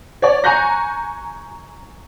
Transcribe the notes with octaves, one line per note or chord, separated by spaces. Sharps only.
C#5 D5
G#5 A#5 C#6 F#6 G6 A#6